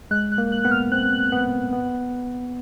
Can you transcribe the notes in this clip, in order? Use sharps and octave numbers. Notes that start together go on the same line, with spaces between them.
G#3 F#6
F#6
A#3
F#6
B3 F#6
F6
C4 F#6
B3
B3